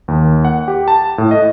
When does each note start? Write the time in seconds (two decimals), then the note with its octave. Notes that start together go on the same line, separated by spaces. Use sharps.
0.08 D#2
0.45 F#5
0.68 G4
0.88 A5
1.18 A2
1.31 D#5